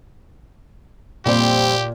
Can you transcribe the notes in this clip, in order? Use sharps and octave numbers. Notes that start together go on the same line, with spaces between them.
F2 A#2 G3 C4 G4